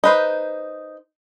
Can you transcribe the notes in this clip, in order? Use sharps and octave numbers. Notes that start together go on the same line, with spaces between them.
D#4 B4 C5